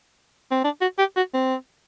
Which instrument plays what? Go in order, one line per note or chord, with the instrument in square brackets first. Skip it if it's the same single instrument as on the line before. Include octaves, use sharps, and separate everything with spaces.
[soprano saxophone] C4
D4
F#4
G4
F#4
C4